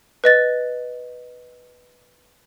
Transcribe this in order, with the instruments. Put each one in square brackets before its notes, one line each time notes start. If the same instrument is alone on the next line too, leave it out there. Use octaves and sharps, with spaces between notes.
[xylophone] B4 D#5 A6